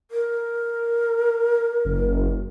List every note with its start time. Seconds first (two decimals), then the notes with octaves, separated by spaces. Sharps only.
0.11 A#4
1.85 F#1